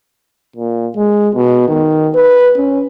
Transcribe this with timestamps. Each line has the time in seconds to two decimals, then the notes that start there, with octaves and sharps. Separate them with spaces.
0.56 A#2
0.96 G#3
1.35 B2
1.68 D#3
2.15 B4
2.57 C#4